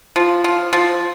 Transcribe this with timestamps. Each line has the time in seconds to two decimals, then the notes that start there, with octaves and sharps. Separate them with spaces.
0.16 F3
0.44 F3
0.73 F3